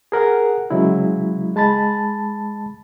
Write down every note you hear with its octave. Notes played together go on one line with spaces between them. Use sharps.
G#4 A#4 F#5
C#3 F#3 G#3 E4
G#3 A5 B5 A6